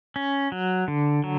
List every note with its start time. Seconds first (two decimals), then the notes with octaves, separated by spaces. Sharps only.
0.16 C#4
0.52 F#3
0.88 D3
1.24 F#3